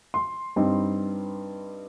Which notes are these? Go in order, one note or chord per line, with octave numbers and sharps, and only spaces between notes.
C6
G2 G3 C4 D#4